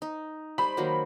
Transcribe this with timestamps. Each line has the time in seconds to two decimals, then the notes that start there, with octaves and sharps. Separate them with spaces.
0.02 D#4
0.58 G3 C5 B5
0.77 D#3 F#3 A#3